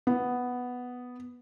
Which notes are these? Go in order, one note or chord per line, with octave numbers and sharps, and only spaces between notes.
B3